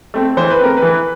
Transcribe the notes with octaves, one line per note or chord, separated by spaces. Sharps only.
A3 C4
E3 C5
B4
A3 C4 A#4
B4
E3